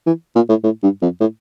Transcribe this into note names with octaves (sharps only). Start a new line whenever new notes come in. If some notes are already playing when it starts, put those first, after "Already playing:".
E3
A#2
A2
A2
G2
F2
A2